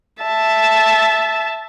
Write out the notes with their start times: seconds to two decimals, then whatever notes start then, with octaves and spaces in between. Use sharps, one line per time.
0.22 E5 A5